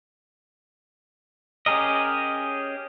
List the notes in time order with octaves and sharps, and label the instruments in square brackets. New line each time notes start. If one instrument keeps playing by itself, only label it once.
[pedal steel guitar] C#4 G4 G#4 A#4 D#5